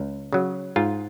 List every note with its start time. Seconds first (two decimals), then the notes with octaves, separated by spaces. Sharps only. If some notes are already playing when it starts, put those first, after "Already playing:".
Already playing: C#2
0.33 C#3 F#3
0.76 G#2 F4